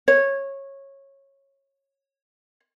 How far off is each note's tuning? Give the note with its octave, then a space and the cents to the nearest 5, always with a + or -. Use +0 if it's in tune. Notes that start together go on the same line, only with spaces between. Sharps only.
C#5 -15